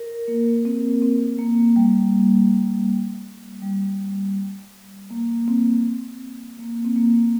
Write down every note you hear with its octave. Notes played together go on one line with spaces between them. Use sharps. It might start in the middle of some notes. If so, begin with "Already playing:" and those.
Already playing: A#4
A#3
C4
C4
A#3
G3
G3
A#3
C4
A#3
C4
A#3